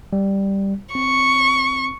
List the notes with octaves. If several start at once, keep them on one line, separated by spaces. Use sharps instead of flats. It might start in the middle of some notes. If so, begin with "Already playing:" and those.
G3
C4 C#6